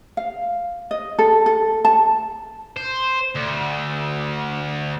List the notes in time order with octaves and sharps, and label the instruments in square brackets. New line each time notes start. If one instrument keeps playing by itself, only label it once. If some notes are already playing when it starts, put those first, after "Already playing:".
[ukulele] F5
D#5
A4
A4
A5
[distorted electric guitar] C5
D2